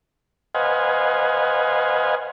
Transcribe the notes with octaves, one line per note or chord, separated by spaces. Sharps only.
B4 C5 D#5 F5 F#5 G#5